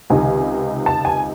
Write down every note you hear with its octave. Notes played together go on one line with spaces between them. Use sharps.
C#2 C3 D#3 G#5
A5
G#5